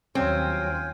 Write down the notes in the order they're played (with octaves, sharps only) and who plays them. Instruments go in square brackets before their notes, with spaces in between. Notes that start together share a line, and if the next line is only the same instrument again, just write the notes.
[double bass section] D#2 [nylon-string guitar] F#3 G3 C#4 [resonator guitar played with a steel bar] C4 [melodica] F4 G5 G#5